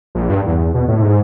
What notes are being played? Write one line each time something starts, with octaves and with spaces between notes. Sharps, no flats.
A#1
G2
E2
B2
A2
G#2